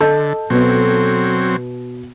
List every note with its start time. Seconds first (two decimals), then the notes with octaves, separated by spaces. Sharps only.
0.01 D3 A4 D#5 G6
0.50 B2 F#3 B3 C4